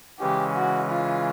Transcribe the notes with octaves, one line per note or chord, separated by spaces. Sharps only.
C#3 E3 G#3 C#4 G4
F#4
F4